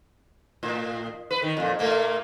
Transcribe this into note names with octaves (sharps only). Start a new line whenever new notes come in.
A2
B4
D#3
F2 A#2
A#2 A3 A#3